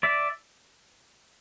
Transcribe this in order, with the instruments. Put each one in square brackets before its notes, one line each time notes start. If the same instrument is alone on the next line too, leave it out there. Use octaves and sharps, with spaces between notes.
[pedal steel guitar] D5 E5